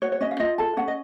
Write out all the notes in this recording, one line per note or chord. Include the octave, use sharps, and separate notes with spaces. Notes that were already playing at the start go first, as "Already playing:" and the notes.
F#4 C#5
C#5
C#4 D#5
F5
F4 D#5
A4 A5
C#4 F#5
D#5